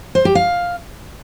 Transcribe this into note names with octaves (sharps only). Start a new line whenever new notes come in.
C5
G4
F5